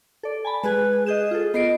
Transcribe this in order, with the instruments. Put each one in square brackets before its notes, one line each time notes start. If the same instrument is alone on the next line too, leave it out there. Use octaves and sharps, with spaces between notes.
[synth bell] A4 D5
G#5 A5 B5
[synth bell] G#3 G#4 G#5 [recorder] B4
[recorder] G#4 [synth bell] D#5 G6 E7
[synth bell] F4 A4
[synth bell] B3 C7 D7 [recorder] D#5